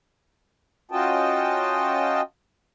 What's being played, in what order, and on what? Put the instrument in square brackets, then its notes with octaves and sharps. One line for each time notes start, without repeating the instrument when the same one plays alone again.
[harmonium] C#4 F4 F#4 D#5 G5 A5